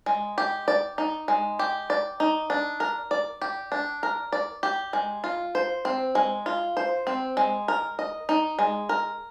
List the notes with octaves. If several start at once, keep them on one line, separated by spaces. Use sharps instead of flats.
G#3
G4
D5
D#4
G#3
G4
D5
D#4
D4
A#4
D5
G4
D4
A#4
D5
G4
G#3
F4
C5
C4
G#3
F4
C5
C4
G#3
A#4
D#5
D#4
G#3
A#4